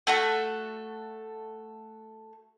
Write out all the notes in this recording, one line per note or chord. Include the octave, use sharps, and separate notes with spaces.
A3 F#4 A4 C#6